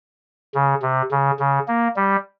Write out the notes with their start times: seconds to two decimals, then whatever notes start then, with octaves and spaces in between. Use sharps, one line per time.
0.55 C#3
0.82 C3
1.11 C#3
1.39 C#3
1.68 A#3
1.96 G3